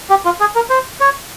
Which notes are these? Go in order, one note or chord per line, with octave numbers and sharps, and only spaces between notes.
G4
F4
G#4
A#4
C5
C#5